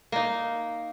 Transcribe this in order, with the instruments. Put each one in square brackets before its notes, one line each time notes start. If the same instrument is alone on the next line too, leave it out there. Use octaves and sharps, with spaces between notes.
[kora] A#3 D#4